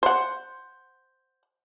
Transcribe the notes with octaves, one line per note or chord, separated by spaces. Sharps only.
C5 F#5